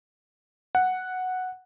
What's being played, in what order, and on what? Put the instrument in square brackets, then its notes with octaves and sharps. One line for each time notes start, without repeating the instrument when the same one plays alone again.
[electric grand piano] F#5